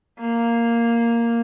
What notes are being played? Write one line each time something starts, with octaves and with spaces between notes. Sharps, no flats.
A#3